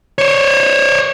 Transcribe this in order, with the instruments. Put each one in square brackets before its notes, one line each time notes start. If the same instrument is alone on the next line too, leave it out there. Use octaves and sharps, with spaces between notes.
[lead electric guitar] C5 C#5